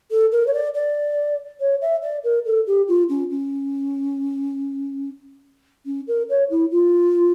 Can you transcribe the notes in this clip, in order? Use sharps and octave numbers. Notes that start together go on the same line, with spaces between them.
A4
A#4
C#5
D5
D5
C#5
E5
D5
A#4
A4
G4
F4
C#4
C#4
C#4
A#4
C#5
E4
F4